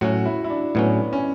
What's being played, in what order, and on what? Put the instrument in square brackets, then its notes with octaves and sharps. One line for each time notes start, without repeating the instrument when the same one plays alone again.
[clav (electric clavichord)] A2 F#3 C#4 [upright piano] F#4
[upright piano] E4
E4
D4
[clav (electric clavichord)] A2 F#3 C#4 [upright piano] B3
[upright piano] C#4